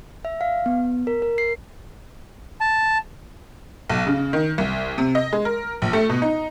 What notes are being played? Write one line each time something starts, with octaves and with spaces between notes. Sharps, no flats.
E5
F5
B3
A#4
A#4
C7
A5
B1
C#3
D#3
C2
C3
D#5
G#3
A#4
A#1
A3
B2
D#4